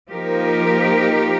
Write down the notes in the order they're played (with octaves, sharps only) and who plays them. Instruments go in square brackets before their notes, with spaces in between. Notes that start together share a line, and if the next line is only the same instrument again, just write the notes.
[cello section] F3 A#3 D#4 G4 A#4